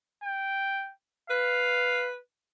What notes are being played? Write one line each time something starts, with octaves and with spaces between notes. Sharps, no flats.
G5
B4 F5